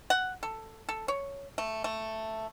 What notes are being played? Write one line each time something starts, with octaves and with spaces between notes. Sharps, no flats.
F#5
A4
A4
C#5
A3
A3